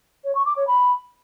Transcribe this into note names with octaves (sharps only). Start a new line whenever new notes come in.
C#5
C#6
D6
C#5
B5